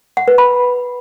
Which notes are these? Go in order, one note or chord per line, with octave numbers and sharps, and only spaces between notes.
F#5
B4
B5